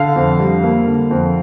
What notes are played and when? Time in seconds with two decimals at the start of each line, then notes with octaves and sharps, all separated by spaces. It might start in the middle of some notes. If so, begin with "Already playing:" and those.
Already playing: D3 F5
0.16 F2
0.40 G3
0.63 A#3
0.87 D3
1.11 F2